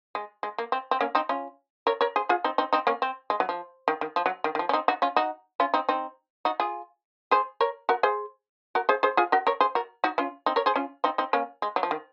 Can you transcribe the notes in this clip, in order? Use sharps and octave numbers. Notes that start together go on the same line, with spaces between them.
G#3
G#3
A#3
C4
C4
A#3 C#4
C4 D#4
C#4 F4
A#4 C#5
A#4 C#5
G#4 C5
F4 G#4
C4 D#4
C4 D#4
C4 D#4
A#3 C#4
C4
G#3
F#3
F3
D#3
D#3
F3
F#3
D#3
D#3
F3
C#4
C4 D#4
D#4 F#4
C#4 F4
D#4 F#4
C#4 F4
C4 D#4
C4 D#4
D#4 F#4
F4 G#4
G#4 C5
A#4 C#5
F#4 A#4
G#4 C5
F#4 A#4
G#4 C5
G#4 C5
F4 G#4
F#4 A#4
A#4 C#5
G#4 C5
F#4 A#4
D#4 F#4
C#4 F4
C4 D#4
A#4 C#5
G#4 C5
C#4 F4
C4 D#4
C4 D#4
A#3 C#4
G#3
F#3
F3
D#3